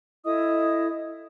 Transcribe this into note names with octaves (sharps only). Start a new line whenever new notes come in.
E4 A4 D#5 D#6